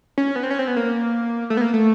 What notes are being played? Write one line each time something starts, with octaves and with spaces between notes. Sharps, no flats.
C#4
B3
C4
C#4
C4
B3
A#3
A3
B3
A#3
A3